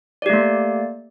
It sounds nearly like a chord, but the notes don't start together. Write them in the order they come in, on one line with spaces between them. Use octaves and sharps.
D5 G4 A3 A#3